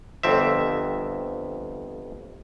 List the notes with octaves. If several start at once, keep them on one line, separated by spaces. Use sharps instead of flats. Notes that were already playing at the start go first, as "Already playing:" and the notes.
G1 F2 C4 E5